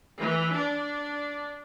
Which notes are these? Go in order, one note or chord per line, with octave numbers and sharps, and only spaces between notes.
E3
D4